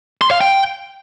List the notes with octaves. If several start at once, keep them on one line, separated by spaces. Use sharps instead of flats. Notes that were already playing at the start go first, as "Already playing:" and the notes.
C6
F5
G5